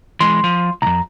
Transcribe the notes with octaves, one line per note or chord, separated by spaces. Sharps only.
E3 G#3 C6
F3
C2 F2 A#5